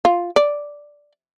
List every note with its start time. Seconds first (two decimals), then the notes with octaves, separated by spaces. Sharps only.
0.05 F4
0.36 D5